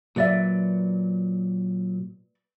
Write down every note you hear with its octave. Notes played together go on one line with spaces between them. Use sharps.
A#2 F#3 B4 D5 E5